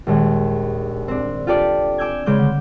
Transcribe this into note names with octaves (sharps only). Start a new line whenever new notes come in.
A#1 D#2 G#3
C4 D4
F4 G4 A4 D5
G#5 D6 E6 G6 G#6
C#3 G#3 D6 G6
D3